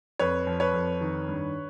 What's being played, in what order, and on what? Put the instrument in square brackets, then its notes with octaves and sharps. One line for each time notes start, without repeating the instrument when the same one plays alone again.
[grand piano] F2 B4 C#5
F3
B4 C#5
F2
D#3
G2